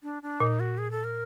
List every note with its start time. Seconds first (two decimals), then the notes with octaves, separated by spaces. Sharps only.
0.03 D4
0.23 D4
0.40 A#2 D#4
0.60 F#4
0.78 G#4
0.91 A4
1.04 A#4